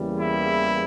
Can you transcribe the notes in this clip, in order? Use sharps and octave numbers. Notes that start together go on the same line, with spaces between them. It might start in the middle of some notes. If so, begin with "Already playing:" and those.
Already playing: E2 C#3 E3 G3 A#3
E4